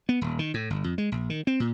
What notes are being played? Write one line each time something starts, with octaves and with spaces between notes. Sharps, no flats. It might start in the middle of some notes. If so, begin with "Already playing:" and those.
B3
D#1
D#3
A2
G1
F2
G#3
A#1
D#3
C4
A#2